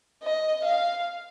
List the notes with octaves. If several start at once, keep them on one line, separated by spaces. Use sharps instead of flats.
D#5
F5